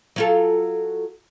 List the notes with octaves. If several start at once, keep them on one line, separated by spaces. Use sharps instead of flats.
F#3 F4 A4